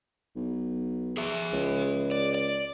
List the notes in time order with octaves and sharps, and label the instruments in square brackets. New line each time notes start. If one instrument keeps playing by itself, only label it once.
[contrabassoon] B1
[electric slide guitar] G#4 E5
[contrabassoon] C#2
[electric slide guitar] D5
D5